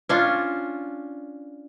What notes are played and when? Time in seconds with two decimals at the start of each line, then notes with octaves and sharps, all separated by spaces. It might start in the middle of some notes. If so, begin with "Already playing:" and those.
0.09 C#4 D4 F4